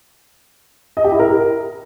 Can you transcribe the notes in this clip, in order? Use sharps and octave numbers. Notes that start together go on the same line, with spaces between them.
D#5
G4
E4
A#4